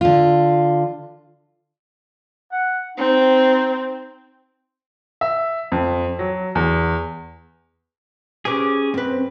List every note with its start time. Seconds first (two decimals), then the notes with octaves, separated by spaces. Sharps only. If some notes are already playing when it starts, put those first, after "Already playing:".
0.01 D3 F4
2.52 F#5
2.98 C4 D#4
5.21 E5
5.72 F2
6.19 F#3
6.55 E2
8.45 C#4 G4 G#4 B4 D6
8.94 F#2 C4 B4